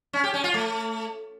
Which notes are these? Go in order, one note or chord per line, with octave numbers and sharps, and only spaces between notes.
C#4
G4
C#4
F4
A3